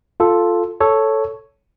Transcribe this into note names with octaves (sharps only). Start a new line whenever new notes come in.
F4 A4
A4 C#5